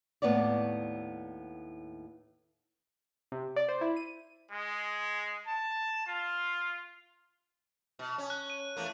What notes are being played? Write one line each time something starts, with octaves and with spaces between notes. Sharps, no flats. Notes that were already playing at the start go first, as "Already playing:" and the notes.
D#2 A2 B3 E4 C#5 D5
C3
D5
C5
E4
D#7
G#3
A5
F4
B2
C#4
F#6
D#7
E2 A3 A#3